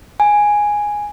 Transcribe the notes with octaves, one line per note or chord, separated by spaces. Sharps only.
G#5